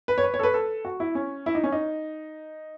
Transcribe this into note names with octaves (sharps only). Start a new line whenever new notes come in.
B4
C#5
B4
C#5
A4
B4
A4
F#4
E4
C#4
E4
D#4
C#4
D#4